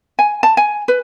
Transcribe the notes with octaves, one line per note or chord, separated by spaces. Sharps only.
G#5
A5
G#5
B4